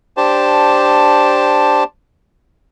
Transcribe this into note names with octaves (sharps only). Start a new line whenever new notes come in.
D4 G4 C5 A5